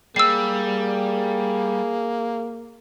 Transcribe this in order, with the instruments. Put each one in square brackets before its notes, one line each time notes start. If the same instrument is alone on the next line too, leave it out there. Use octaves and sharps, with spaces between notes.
[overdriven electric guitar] G3 [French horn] A#3 [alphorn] G#4 [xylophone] E6 C7